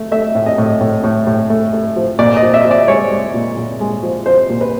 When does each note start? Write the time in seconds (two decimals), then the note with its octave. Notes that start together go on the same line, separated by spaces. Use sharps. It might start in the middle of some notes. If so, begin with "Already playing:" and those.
Already playing: A3
0.12 A3 E5
0.35 A2
0.46 D#5
0.58 A2
0.81 A2
1.04 A2
1.27 A2
1.50 A3
1.73 A3
1.96 F3
2.19 A#2 D5
2.37 D#5
2.42 F3
2.54 E5
2.65 F3
2.71 D5
2.88 G#3 C#5
3.11 G#3
3.34 A#2
3.57 A#2
3.80 G#3
4.03 F3
4.26 F3 C5
4.50 A#2
4.61 B4